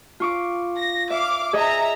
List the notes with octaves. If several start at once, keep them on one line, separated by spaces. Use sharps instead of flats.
F4 C#6 D6
A#6
E5 F5 D6
G#4 D#5 E5 A#5